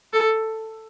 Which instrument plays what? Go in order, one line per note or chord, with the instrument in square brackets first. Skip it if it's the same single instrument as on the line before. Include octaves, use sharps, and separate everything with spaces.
[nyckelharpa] A4